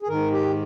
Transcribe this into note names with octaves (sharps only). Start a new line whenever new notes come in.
G#4
G#2 D#3 A#4
G4